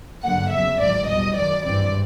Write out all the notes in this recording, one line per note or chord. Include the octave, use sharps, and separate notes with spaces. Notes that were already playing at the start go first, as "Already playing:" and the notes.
G2 D3 F#3 A#3 F#5
E2 C#3 F#3 E5
A1 G#2 D#3 F#3 D5
E2 B2 G3 D#5
F#2 D#3 F#3 D5
G#1 G2 E3 G3 C4 D5